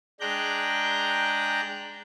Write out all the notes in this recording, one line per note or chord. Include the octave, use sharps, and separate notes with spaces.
G#3 D4 G5 A#5 F#6 G6